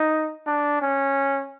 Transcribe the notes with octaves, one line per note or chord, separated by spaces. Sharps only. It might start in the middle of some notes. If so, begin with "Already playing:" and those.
Already playing: D#4
D4
C#4